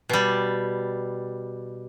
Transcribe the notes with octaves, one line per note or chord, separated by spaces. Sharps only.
B2 G3